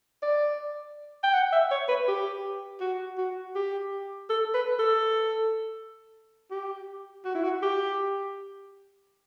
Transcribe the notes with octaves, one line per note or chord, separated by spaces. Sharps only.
D5
G5
F#5
E5
C#5
B4
G4
F#4
F#4
G4
A4
B4
A4
G4
F#4
E4
F#4
G4